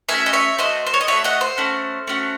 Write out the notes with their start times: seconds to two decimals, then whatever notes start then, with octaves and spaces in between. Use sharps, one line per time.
0.09 A3 C#4 F#4 E5 G#5
0.26 D#5
0.33 C#5 E5
0.58 A3 C#4 F#4 C5 D#5
0.87 C5
0.94 C#5
1.01 D#5
1.08 C#4 F#4 C#5 E5
1.12 A3
1.24 D#5 F#5
1.41 C5
1.58 A3 C#4 F#4
2.07 A3 C#4 F#4